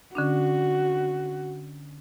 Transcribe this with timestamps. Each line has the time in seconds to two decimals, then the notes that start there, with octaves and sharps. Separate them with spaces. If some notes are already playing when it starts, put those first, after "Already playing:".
0.15 D3 C#4 D4 F#4